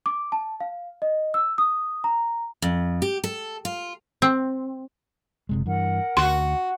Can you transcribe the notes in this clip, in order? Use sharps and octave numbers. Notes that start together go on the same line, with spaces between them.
D6
A5
F5
D#5
E6
D#6
A#5
F2
G4
A4
F4
C4
F#1 C3 G#3
G2 E3 A#4 F#5
D2 F#4 C6